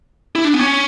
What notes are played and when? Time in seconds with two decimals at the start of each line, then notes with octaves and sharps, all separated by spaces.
0.35 E4
0.45 D4
0.54 B3
0.59 C#4